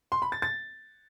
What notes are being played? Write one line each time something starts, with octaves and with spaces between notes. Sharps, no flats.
C6
B5
A6
A6